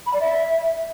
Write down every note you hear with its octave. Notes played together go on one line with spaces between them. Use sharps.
B5
D5
E5